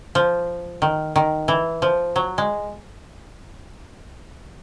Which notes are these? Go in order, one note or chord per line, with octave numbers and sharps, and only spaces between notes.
F3
D#3
D#3
E3
F3
F#3
G#3